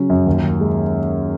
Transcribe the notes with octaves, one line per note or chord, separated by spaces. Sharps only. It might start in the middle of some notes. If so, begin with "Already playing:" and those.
Already playing: C#3 F#3 C#4
F#2
D#2
D#3
G#3